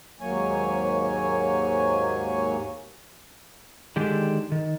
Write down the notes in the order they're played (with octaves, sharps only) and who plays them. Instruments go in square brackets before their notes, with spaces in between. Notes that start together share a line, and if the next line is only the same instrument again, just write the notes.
[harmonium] D#2 G#2 F#3 A#3 C#5 G#5
[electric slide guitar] D3 D#3 G#3 D4 G4
D#3